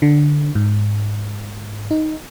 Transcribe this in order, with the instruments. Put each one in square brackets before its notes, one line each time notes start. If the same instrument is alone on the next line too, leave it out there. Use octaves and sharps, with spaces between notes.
[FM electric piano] D3
G#2
D#4